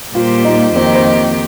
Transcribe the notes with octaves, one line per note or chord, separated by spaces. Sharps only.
A#2 G3 A#3 F4 G4 C5
D#4
F2 D#3 A#3 C4 G4
D#4
C5
D#5